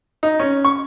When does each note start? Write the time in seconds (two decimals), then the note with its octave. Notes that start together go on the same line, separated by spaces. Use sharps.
0.23 D#4
0.39 C#4
0.65 C#6